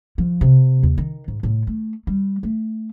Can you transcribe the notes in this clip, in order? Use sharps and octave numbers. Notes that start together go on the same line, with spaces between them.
F3
C3
D#2
D#3
G#2
A2
A3
G3
A3